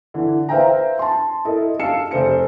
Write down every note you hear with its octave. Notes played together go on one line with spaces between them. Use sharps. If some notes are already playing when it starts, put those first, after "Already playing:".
D3 E3
B4 C5 E5 F5 G5 A#5
A5 C6
E4 A4 A#4 D#5
F5 A5 E6 C7 C#7 E7
F1 C5 C#7